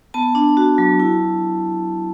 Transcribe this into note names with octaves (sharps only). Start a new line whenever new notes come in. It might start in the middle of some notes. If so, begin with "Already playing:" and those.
B3 A5
D4
F#4
F#3
E4